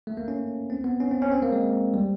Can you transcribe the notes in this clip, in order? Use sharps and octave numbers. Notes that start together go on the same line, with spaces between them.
A3
A#3
C#4
C4
B3
C#4
C4
C#4
C4
A#3
G#3
G3